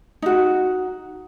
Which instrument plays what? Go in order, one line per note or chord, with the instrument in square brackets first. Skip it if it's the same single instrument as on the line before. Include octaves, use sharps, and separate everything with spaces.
[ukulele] D#4 F#4